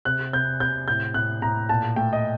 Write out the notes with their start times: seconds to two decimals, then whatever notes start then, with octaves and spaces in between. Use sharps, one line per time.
0.05 C3 F#6
0.33 C3 G6
0.60 C3 G6
0.88 A2 G6
1.14 A2 F#6
1.42 A2 A#5
1.69 A#2 A5
1.96 A3 G5
2.13 D#5